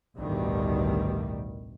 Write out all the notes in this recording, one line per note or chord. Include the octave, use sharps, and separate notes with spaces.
A1 D2 G2 B2 D#3 G3